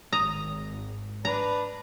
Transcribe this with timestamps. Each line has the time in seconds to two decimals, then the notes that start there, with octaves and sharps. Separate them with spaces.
0.13 G#1 A#5 D#6
1.25 D4 B4 A#5